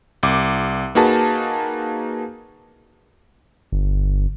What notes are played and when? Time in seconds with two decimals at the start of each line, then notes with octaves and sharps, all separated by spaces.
0.23 C2 D6
0.95 A#3 D#4 F#4 G#4 B4 A5
3.72 G1